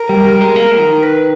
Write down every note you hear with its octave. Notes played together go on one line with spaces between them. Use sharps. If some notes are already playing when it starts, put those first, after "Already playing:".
Already playing: A#4
G3
G3
G#3
A#3
D#3
B4